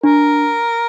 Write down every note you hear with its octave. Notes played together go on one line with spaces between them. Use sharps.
D4 A#4